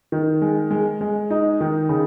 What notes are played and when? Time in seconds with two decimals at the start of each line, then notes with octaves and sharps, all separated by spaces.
0.12 D#3
0.42 G#3
0.71 G#3
1.01 G#3
1.30 D#4
1.61 D#3
1.89 C#3